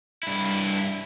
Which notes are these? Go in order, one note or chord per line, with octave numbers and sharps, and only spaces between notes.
G2 E4